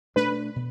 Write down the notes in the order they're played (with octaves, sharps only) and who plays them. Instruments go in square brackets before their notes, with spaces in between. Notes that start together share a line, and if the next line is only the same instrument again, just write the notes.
[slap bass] B2 A3 D4 [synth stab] B4
[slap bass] B2